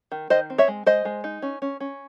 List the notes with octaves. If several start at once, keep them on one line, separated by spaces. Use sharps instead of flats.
D#3
D#3 C5 D#5
C4
C#5 E5
G#3
G#3 C5 D#5
G#3
D#4
C#4
C#4
C#4